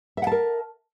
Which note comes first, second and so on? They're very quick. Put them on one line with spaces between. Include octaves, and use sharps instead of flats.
E5 F#5 A5 A#4